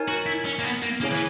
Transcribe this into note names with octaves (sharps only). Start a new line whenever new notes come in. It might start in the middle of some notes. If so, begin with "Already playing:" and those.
Already playing: D#4 A#4 C#5 G#5
F#4
E4
C#4
A#3
B3
A#3
A#3 C#4 E4 G#4 C#5 G#5
E3